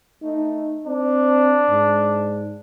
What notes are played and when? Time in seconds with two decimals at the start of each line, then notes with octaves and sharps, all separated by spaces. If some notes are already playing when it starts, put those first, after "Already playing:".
0.23 A3 D#4
0.86 C4 D4
1.70 G#2